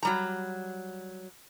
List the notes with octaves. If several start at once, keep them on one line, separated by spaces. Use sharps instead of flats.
F#3 G3 A#5